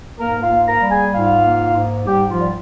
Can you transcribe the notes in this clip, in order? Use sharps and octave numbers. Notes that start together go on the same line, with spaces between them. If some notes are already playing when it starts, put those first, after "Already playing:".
G#2 A#3 A#4
F4 F5
A#3
A#4 A#5
G3
G#4 G#5
G#2 F4 F5
A#3
G#2
G#2 G3 G4
F3 F4
G3